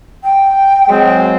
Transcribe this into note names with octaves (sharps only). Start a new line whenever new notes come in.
G5
F#3 G#3 C4